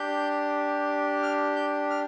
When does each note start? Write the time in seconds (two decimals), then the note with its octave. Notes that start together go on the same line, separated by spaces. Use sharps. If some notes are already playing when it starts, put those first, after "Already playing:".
Already playing: D4 G4 G6
1.23 F6
1.56 G6
1.90 F6